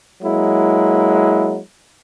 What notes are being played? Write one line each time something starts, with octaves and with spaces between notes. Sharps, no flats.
F#3 G#3 A#3 E4